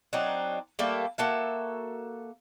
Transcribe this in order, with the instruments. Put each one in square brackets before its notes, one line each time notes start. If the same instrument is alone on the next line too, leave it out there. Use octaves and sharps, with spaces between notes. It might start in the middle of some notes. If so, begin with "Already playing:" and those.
[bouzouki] F#3 C4 D4 D#4
G3 A3 A#3 A4
A#3 F#4 A4 E5